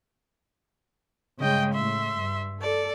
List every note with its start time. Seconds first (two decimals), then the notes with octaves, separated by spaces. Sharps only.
1.40 G2 C#3 G#3 D#5 G5
1.74 A2 E5 C6
2.17 G2
2.61 A4 D5